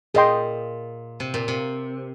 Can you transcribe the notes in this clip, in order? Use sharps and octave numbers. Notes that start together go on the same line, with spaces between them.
A#2 G#4 D#5 G5 C6
C3
A#2
C3